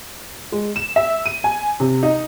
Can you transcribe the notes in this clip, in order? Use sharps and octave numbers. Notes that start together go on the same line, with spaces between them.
G#3
E7
E5
D#7
G#5
C3
D#4